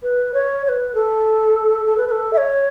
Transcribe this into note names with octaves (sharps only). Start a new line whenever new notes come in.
B4
C#5
C#5
B4
A4
A4
B4
B4
A4
E5
C#5